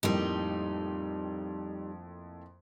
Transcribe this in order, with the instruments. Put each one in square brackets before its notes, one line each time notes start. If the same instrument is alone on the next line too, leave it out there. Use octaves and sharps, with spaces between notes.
[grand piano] F2 A2 A#3 [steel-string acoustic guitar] G3 D#4